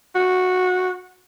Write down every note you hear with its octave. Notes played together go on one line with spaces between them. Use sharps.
F#4